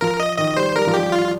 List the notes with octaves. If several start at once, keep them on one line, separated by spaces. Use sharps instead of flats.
F3 A#4
D#5
D#3 D#5
G3 C5
G3 A#4
F3
G4
G3
F4